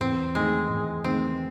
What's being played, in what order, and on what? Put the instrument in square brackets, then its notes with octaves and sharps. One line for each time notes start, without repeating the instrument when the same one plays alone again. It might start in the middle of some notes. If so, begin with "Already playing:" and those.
[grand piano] E2 [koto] C4
[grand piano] D#3 A3 D#4 G#4 [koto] G#3
[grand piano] E2
[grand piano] D#3 A3 D#4 G#4 [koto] C4